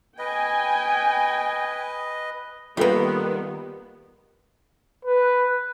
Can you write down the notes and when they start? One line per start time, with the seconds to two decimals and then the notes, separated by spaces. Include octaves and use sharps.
0.19 B4 D#5 G5 G#5
2.77 D#3 G3 A#3 B3 F4 A4 B4
5.05 B4